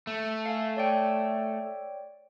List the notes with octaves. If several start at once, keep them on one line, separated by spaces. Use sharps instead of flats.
A3
F5 G#5
C#5 D5 G5